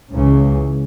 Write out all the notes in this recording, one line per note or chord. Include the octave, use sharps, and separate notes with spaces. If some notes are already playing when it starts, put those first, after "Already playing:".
C#2 C#3 E3